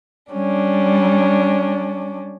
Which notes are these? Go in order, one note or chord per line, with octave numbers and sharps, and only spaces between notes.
G3 C#4 D4